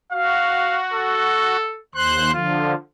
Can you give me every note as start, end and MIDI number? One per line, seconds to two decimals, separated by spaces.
0.12 1.57 66
0.12 0.79 77
0.94 1.79 69
1.95 2.31 39
1.95 2.31 72
1.95 2.31 84
1.95 2.31 90
2.33 2.74 50
2.33 2.74 53
2.33 2.73 65